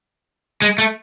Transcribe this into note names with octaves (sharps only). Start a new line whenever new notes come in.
G#3
A3